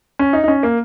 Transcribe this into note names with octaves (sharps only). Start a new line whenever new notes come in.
C#4
D#4
D#4
C#4
A#3